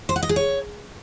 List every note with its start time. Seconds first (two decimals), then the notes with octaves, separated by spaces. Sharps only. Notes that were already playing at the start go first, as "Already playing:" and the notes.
0.09 C5
0.16 F#5
0.23 D#5
0.29 G#4
0.36 C#5